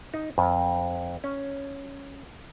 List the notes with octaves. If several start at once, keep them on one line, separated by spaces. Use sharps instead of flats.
D#4
F2
C#4